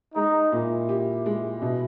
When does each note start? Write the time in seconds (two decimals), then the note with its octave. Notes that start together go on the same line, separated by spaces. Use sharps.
0.15 G#3 D#4
0.52 A#2 E4
0.89 G4
1.26 G#3
1.62 B2